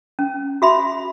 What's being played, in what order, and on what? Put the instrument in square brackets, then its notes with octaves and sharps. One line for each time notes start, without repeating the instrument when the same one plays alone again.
[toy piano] C#4
F#4 E5 B5